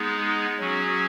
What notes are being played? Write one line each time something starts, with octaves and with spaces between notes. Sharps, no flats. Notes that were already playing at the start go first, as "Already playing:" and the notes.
Already playing: G#3 B3 D#4 G#4
F#3 C#4 F#4